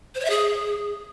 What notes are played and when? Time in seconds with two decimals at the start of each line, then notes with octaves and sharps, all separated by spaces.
0.15 C5
0.20 C#5
0.25 E5
0.30 G#4